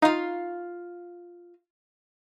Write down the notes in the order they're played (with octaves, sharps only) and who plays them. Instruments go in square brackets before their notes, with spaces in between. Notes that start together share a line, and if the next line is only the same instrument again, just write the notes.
[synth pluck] D#4 [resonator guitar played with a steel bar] F4 F5